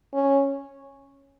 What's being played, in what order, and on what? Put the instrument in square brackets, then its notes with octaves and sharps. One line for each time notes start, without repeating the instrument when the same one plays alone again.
[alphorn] C#4